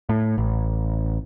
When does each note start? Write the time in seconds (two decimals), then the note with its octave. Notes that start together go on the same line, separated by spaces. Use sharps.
0.09 A2
0.38 A1